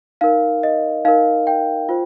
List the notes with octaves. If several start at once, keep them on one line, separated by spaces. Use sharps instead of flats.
D#4 A#4 F5
D#5
D#4 A#4 F5
G5
F4 C5